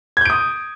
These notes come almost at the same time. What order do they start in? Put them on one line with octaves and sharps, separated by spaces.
G#6 G6 D7 D#6